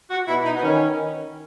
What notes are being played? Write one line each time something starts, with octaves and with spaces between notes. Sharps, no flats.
F#4
B2 E4
D#4
B3
D#3 C#4